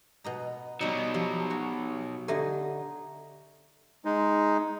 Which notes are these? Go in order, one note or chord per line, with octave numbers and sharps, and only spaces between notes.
B2 D#5 A#5
B2 F#3 G3 D#4
F3 G4
F#4 C#5
D3 D#4 G4 A4 E5 G#5
G#3 D#4